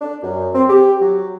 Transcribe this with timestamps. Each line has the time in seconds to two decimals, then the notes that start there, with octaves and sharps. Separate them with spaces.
0.01 D4
0.23 F#2
0.53 C4
0.68 G4
1.00 F#3